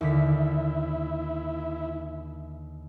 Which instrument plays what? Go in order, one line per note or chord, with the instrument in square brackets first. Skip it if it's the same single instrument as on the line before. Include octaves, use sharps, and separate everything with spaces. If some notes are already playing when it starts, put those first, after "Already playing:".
[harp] D#2 D3 B6 [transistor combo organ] E4